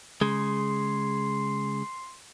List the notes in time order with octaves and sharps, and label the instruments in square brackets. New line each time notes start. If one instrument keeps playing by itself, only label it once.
[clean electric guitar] C#3 G#3 [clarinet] C6